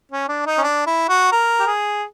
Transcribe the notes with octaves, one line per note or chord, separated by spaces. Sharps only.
C#4
D4
D#4
C#4
D4
E4
F#4
A#4
G4
G#4